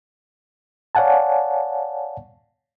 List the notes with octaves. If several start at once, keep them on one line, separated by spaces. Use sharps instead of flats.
C#5 D5 F5 F#5 G#5 A5